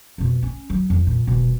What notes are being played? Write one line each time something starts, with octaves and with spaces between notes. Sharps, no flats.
F2 B2
C#4
F#3
F2
A#2
D#1 B2